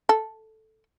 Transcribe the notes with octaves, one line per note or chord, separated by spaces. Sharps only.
A4